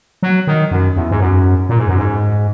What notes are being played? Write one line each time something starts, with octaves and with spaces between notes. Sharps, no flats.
F#3
D#3
F#2
E2
G#2
F#2
A#2
G#2
F#2
G#2